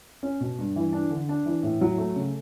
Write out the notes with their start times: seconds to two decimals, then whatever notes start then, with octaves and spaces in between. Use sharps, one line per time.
0.23 C#4
0.41 B2
0.58 G2
0.76 E3
0.92 D4
1.11 D3
1.29 D4
1.46 E3
1.63 A2
1.81 F#3
1.98 A3
2.16 C#3